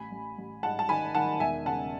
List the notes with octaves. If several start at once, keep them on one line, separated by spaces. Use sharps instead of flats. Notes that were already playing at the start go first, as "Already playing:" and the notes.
Already playing: A1 G#5 B5
A1
A1
G#2 F#5 A5
A5
D#3 G#5 B5
D#3 F#5 A5
E1 E5 G#5
C#3 F#5 A5